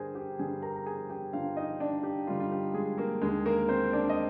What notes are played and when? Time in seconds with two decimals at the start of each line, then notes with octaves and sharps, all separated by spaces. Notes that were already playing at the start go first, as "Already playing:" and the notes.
Already playing: G2 D3 G3 G#4 A#4 C5 G#5
0.15 G4 G5
0.39 G2 D3 G3 G#4 G#5
0.62 A#4 A#5
0.76 A#5
0.86 G#4 G#5
1.10 G4 G5
1.33 G2 D3 G3 F4 F5
1.57 D#4 D#5
1.80 D4 D5
2.03 G4
2.27 G2 D3 G3 F4
2.40 F4
2.51 G4
2.74 G#3 G#4
2.98 A#3 A#4
3.22 D#2 D3 G#3 G#4
3.46 A#3 A#4
3.69 C4 C5
3.93 D4 D5
4.10 D#5